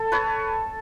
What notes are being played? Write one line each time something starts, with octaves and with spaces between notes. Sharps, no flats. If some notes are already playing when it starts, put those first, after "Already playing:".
Already playing: A4
B4 C#5